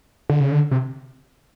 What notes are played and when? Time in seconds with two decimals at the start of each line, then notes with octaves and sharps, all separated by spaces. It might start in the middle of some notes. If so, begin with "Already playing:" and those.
0.30 D3
0.40 C#3
0.52 D3
0.71 C3